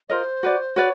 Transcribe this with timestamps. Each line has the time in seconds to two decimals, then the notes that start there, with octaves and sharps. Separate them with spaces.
0.09 F4 A#4 C5 C#5 D#5
0.43 F#4 B4 D5
0.76 F#4 B4 C#5 D5